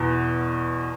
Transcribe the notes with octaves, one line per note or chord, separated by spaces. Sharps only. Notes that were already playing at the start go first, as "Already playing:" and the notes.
Already playing: E2 B2